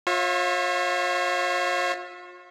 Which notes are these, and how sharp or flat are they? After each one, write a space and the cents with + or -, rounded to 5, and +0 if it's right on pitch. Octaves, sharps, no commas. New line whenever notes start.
F4 +35 C#5 -35 E5 +0